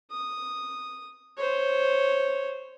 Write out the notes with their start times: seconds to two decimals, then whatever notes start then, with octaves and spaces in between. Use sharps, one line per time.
0.11 D#6
1.38 C5 C#5